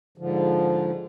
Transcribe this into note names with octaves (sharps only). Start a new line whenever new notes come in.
G#2 D3 F3